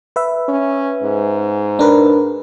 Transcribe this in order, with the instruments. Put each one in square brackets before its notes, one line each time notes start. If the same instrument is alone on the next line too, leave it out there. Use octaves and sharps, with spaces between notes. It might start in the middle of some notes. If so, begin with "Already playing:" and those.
[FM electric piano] B4 E5
[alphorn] C#4
G#2
[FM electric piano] D4 A#4 B4